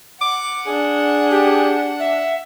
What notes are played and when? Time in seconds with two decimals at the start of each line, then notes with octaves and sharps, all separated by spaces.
0.21 F#5 D6
0.67 D4 G#4
1.31 G4
2.00 E5